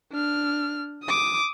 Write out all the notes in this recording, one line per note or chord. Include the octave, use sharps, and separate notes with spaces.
D4 F6
D6 D#6